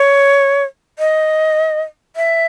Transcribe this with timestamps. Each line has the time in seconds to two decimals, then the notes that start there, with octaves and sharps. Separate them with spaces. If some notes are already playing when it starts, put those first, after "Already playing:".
Already playing: C#5
0.99 D#5
2.16 E5